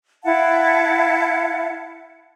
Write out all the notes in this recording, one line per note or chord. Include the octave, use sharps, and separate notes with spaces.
E4 F5 F#5 A5